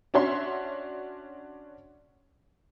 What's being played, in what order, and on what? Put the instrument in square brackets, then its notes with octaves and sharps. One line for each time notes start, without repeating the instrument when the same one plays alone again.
[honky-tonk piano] C#4 D4 F#4 C#5 E5 C6